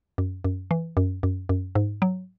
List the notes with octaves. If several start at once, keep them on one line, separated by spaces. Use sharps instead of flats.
F#2
F#2
E3
F#2
F#2
F#2
G#2
F#3